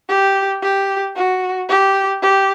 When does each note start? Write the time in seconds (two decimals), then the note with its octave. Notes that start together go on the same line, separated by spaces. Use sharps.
0.09 G4
0.62 G4
1.16 F#4
1.69 G4
2.22 G4